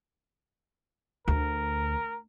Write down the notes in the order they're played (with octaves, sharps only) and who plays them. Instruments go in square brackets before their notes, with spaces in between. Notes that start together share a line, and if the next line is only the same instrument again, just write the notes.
[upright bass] D2 [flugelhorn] A#4